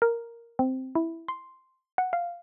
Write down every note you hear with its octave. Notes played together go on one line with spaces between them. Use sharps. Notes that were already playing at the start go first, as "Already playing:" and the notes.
A#4
C4
E4
C6
F#5
F5